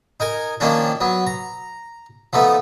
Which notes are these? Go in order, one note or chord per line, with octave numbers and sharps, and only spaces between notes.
D#4 A#4 G#5
D#3 F3 A#3 C#4 D4
F#3 B3
A#5
F3 A3 B3 D#4